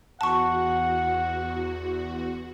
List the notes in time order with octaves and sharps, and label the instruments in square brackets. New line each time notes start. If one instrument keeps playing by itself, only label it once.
[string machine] E2 F#4 [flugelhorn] F#5 [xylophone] A5 C#6